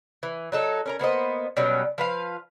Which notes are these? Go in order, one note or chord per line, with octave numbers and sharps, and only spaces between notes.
E3
F#3 D#4 A4
C#4 A#4 A#5
A#3 B3 C5 D#5
B2 F#3 G3 C#4
F3 B4 F5